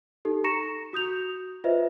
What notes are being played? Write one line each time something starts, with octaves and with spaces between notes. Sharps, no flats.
D#4 G4 A4
A#5 C#6 A#6 C#7 E7
F#4 D#6 G6 F7
F4 B4 C5 D#5 E5